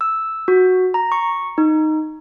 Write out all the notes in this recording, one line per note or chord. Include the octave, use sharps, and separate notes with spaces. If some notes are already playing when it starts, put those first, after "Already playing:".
E6
F#4
A#5
C#6
D#4